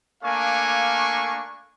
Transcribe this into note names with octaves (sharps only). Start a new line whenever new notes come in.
A3 A#3 D4 F5 G#5 C#6